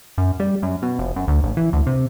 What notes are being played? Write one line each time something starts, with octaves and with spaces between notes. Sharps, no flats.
F#2
G3
F#2
B2
F1
F#2
D2
A1
E3
D2
C3